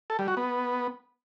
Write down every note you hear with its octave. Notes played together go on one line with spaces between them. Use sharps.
A4
G3
F#4
B3